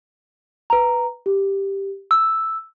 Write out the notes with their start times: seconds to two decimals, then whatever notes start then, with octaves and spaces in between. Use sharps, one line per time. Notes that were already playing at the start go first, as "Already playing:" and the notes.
0.70 B4 A#5
1.26 G4
2.11 E6